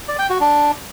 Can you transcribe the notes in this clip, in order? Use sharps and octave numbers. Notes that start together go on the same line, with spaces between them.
D5
G5
F#4
D4